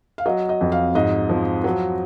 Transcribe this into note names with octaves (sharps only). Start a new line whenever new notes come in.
F5
F#3 D#5
D#5
F2
F5
G#2 D#5
F3
F#3